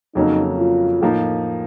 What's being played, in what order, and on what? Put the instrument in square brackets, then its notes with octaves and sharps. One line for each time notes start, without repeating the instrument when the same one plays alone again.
[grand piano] F2 C#3 F#3 A#3 C#4 [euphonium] D#4
[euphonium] F4
[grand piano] A2 F3 A#3 D#4